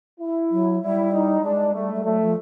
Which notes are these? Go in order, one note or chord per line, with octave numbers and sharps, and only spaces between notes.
E4
F#3
G3 E4
D#4
G#3 D4
G3 A3
G3
F#3 A3
F3